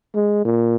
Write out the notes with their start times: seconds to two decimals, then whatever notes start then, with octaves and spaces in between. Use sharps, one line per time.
0.15 G#3
0.45 A#2